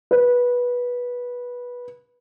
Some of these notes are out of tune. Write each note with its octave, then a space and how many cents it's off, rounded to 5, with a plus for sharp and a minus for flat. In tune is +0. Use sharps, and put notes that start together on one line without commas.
B4 -15